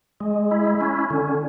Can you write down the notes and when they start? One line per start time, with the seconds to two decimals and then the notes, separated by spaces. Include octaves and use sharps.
0.20 G#3
0.51 E4
0.81 C#4
1.10 D3